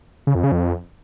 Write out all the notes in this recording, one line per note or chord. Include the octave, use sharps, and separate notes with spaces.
C#3
F2
C#3
F2